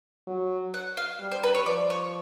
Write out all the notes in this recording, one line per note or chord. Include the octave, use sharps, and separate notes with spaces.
F#3
F#5
F5
G3
C5
B4
C#5
F3 D5
C#5